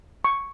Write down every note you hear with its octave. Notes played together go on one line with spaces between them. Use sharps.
C#6